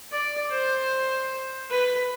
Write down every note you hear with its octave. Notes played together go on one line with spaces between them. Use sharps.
D5
C5
B4